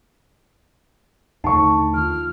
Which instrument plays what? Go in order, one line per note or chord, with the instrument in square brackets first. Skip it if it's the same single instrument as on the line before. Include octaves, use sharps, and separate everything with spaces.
[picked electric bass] D#2 D3 A3 [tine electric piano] D#4 [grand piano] A5 C#6
[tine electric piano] D#3 F4 [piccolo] F6